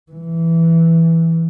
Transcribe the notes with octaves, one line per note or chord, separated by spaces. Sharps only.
E3